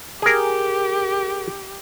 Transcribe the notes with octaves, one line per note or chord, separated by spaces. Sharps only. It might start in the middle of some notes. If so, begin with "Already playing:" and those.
G4 G#4 A#4